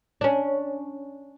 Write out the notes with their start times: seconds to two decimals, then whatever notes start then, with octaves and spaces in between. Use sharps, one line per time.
0.21 C#4 D4